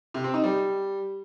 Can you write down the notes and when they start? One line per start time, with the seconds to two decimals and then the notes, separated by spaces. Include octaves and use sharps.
0.14 C3
0.24 C4
0.34 D#4
0.44 G3